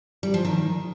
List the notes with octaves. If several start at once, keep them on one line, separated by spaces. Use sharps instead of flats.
G3
F3
D#3